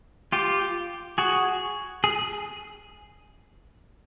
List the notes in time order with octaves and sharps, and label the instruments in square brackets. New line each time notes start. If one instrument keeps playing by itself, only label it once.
[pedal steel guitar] F4 G4
F#4 G#4
G#4